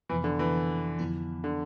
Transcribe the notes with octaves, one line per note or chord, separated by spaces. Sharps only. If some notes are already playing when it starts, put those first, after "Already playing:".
F2 C3 E3 F3 B3
D3
E3
F2 D3 F3 B3 E4
D3